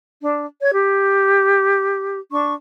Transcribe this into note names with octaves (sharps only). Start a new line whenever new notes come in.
D4
C#5 G#6
G4
D4 C#6